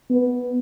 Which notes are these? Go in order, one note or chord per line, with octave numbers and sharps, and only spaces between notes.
B3